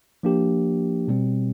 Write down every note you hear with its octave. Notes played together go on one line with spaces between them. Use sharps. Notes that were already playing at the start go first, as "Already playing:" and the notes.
F3 A#3 D4 G4
B2 G3 C4